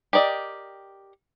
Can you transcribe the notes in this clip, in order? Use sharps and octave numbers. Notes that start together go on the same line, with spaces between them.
G4 A#4 D5 D#5